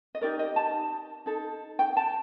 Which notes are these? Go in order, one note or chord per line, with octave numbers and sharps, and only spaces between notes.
D#5
D#4 G4 A#4 D5
D#5
A5
D#4 A4
G5
A5